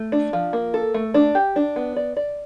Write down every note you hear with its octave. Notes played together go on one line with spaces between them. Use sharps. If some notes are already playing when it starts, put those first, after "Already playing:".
Already playing: A3
D4
F3
A#3
A4
A3
D4
G4
D4
B3
D5
D5